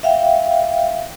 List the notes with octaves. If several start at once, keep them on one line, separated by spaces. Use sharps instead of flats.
E5 F5 G5